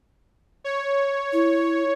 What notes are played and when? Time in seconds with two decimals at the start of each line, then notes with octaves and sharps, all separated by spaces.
0.64 C#5
1.33 E4